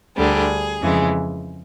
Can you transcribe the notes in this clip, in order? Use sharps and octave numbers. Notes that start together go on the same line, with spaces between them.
D2 D3 G3 G#4
F2 C#3 E3 G#3